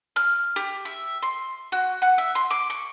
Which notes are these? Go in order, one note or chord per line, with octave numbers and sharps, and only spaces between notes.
F6
G4
E5
C6
F#4
F#5
E5
C6
D6
C#6